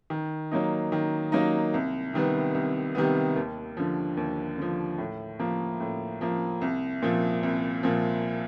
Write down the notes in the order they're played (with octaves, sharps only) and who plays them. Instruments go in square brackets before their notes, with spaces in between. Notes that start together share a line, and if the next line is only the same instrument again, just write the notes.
[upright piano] D#3
F#3 A#3 D#4
D#3
F#3 A#3 D#4
C2
C3 D#3 G3 B3
C2
C3 D#3 G3 B3
D#2
D3 F3
D#2
D3 F3
A2
F3 A#3
A2
F3 A#3
C2
A#2 F3
C2
A#2 F3